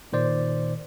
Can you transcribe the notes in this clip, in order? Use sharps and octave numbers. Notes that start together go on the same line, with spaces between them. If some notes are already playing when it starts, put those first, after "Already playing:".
A#2 D#3 C5 D5